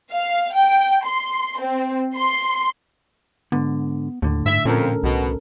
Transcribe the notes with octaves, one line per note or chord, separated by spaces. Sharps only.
F5
G5
C6
C4
C6
G#2 D3 B3
D#2 A2 D3
G#2 E5
F2 A#2 C#4 A4 A#4
C2 B2